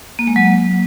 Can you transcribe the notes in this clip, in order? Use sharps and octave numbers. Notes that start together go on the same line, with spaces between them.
A#3
G#3
F#3
A#3